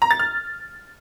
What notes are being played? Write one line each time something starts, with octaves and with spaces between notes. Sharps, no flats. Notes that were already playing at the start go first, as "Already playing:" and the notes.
A#5
A6
F6